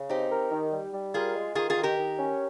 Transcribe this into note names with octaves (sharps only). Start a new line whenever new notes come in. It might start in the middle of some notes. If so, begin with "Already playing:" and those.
Already playing: C#3
C4 D#4 G4
A#4
D#3
G3
G3
F4 G#4 A#4
G#3
D#3 F4 G#4
F4 G#4
D#3
G4 A#4
D#3
C#4